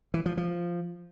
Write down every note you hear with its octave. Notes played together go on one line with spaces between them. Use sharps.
E3
F3
F3